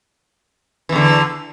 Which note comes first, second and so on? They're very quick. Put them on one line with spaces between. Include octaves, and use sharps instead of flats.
E3 E2 D3